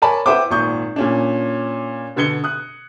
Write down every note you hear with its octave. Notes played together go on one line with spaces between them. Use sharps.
A#4 C#5 D5 G#5 A5 B5
E4 B4 C5 F#5 G5 D6
G#1 A#2 C#6 D#6 G6
A#2 C#4 D4
B2 D3 B3 G#6 C#7 G7
D#6 F#6